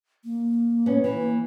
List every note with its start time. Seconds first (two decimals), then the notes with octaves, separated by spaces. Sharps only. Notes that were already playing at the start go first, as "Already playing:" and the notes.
0.24 A#3
0.86 B3 C#4
1.04 E3 A#3